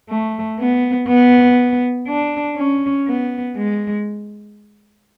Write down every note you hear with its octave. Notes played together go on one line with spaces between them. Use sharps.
A3
B3
B3
D4
C#4
B3
G#3